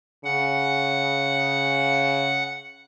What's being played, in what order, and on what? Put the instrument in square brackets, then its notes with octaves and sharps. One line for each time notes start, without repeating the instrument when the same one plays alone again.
[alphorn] C#3 [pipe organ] F#5